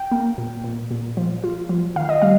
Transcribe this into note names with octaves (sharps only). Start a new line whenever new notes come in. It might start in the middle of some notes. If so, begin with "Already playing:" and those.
Already playing: G5
A#3
A#2
A#2
A#2
F3
F4
F3
D#3 F5
D#5
G3 F5